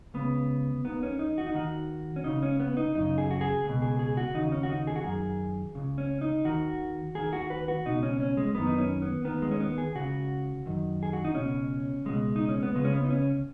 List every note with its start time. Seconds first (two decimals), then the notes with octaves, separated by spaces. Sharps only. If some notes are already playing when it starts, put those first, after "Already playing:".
0.14 C#2 C#3 B3
0.85 D#2 D#3 B3
1.03 C#4
1.19 D#4
1.38 F#4
1.47 D#4
1.54 D#2 D#3 F#4
2.16 C#4
2.24 C#2 C#3 D#4
2.43 C#4
2.60 B3
2.77 D#4
2.95 F#2 C#3 D#4
3.18 G#4
3.31 F#4
3.41 G#4
3.64 C#2
3.69 B2
3.82 G#4
3.99 G#4
4.17 F#4
4.34 D#2 C#3 D#4
4.52 C#4
4.63 F#4
4.69 D#4
4.87 G#4
4.96 F#4
5.04 F#2 D#3 G#4
5.75 C#2 C#3
5.98 C#4
6.21 D#4
6.45 D#2 D#3 F#4
7.15 D#2 D#3 G#4
7.33 F#4
7.50 B4
7.68 F#4
7.86 C#2 B2 D#4
8.03 C#4
8.20 C#4
8.37 G#3
8.55 F#2 D#3 B3
8.67 D#4
8.78 C#4
9.02 B3
9.25 D#2 D#3 B3
9.42 G#3
9.51 C#4
9.60 B3
9.78 G#4
9.95 C#2 C#3 F#4
10.66 F#2 D#3
11.03 G#4
11.13 F#4
11.25 D#4
11.35 C#2 B2 C#4
12.05 C#2 B2 G#3
12.36 D#4
12.49 C#4
12.63 B3
12.75 C#2 C#3 G#3
12.85 C#4
12.93 B3
13.05 D#4
13.10 C#4